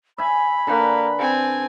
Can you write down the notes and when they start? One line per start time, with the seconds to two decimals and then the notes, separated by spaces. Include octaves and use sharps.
0.18 E5 G#5 B5
0.67 D3 A#3 B4
1.19 C4 G#5